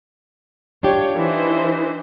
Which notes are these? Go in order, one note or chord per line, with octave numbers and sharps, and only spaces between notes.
D4 F4 G4 C#5
E3 D#4 C5